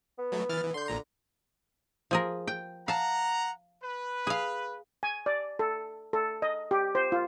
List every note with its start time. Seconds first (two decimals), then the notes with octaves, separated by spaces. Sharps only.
0.18 B3
0.32 F#3 A3
0.49 E3 F6 A6
0.63 E3
0.74 D3 C6 G6
0.88 A#1 A#2 A#5
2.11 F3 G#4 A#4
2.48 G5
2.88 F5 F#5 A5 A#5
3.83 B4
4.27 G#4 F5
5.03 G#5
5.26 D5
5.59 A4
6.13 A4
6.42 D#5
6.71 G4
6.95 C5
7.12 F4